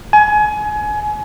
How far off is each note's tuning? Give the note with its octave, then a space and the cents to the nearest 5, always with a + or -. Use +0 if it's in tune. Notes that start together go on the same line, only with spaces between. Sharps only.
G#5 +25